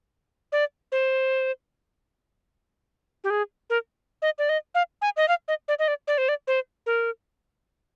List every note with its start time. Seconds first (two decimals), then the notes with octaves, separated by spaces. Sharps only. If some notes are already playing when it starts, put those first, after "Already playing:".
0.52 D5
0.92 C5
3.24 G4
3.30 G#4
3.70 A#4
4.22 D#5
4.39 D5
4.49 D#5
4.75 F5
5.02 G#5
5.17 D#5
5.28 F5
5.48 D#5
5.68 D5
5.79 D#5
5.88 D5
6.08 D5
6.18 C5
6.29 D5
6.47 C5
6.86 A#4